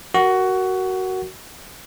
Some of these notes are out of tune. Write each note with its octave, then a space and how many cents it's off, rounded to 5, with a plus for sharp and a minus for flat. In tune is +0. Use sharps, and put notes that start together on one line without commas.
F#4 +15 A#4 +0